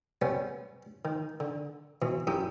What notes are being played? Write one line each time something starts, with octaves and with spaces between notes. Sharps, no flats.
C3 G3 B3 C#4
D#3
D3
B2 E3
F#2 E4 G4 D#6